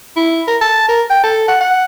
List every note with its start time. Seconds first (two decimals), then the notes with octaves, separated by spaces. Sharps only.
0.17 E4
0.48 A#4
0.61 A5
0.89 A#4
1.10 G5
1.24 A4
1.48 F#5
1.61 F#5